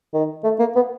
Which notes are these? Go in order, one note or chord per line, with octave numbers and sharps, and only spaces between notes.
D#3
A3
A#3
B3